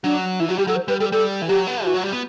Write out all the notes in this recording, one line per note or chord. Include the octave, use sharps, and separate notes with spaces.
F#3 D4
E3 E4
F#3 F#4
G3 G4
F#3 A4
C5
G3 B4
G3 A4
G3 A4
E3
F#3 G4
B3
E3 F#4
F#3
G3
B3